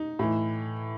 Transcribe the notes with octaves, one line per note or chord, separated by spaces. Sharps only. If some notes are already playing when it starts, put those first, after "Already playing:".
Already playing: D#4
A2 E3